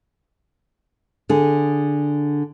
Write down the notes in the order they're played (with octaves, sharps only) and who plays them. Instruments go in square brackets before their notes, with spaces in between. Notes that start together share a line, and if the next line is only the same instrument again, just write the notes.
[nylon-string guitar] D3 G#4